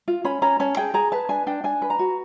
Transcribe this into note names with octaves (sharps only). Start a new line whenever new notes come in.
F4
C#4 B5
C#4 A#5
C#4 A5
G#4 G5
G#4 A#5
B4 A5
D4 G#5
D4 G5
D4 G#5
B4
A#5
F#4